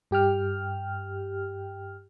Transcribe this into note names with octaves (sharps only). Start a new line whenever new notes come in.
G2 G4 G5 F6